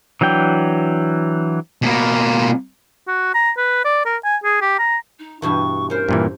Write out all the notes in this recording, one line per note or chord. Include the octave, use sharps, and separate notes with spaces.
E3 F#3 D4 G5
B2 A#3
F#4
A#5
B4
D5
A#4
G#5
G#4
G4
A#5
D#4
G2 B2 E3 C#6
C#4 A#4 C5
G2 A#2 E3